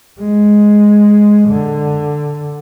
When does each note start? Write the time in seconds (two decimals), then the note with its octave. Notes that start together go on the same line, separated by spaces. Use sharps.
0.19 G#3
1.49 D3